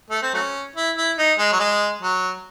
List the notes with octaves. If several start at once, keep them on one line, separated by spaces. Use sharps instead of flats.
A3
C4
F#3 A3 C#4
E4
E4
D#4
G#3
F#3
G#3
F#3